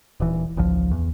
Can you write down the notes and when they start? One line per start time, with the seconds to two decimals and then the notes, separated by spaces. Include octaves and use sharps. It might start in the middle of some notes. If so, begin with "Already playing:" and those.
0.20 D#1 E3
0.57 G#1 C#2 F3
0.91 E2